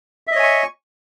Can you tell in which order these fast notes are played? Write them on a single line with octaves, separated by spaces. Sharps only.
E5 D#5 C#5 G#5 C#6